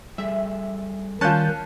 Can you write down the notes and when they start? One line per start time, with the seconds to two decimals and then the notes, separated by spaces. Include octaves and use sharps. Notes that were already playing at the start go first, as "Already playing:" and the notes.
0.18 G3 G#4 A4 E5
1.21 D#3 G3 C#4 F4 A5 F#6 G6